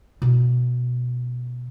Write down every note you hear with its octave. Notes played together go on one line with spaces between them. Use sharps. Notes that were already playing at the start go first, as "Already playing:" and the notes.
B2 C#4